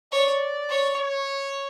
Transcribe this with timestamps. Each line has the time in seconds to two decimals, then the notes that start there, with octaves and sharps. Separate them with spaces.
0.12 C#5 D5
0.70 C#5
0.99 C#5